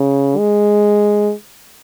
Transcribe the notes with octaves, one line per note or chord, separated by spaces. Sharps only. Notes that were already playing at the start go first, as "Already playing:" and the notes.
Already playing: C#3
G#3